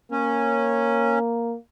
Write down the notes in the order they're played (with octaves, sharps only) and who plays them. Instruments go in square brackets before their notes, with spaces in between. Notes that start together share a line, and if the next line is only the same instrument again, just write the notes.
[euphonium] A#3 [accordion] C#4